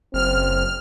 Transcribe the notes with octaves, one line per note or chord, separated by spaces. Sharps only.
F#1 C4 F6